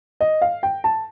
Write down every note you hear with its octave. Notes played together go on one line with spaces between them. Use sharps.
D#5
F5
G5
A5